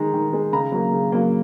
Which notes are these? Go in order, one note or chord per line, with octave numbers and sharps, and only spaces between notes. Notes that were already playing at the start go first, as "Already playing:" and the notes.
Already playing: D#3 G#3 A#5
D#3
G#3
C#3 A#5
F#3 A#3
C#3
F#3 A#3